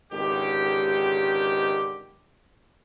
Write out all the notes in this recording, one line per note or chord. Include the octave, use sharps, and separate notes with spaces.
G#1 C#2 D3 D#3 G4